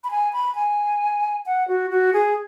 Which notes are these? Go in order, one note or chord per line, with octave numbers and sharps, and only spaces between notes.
B5
G#5
B5
G#5
F#5
F#4
F#4
G#4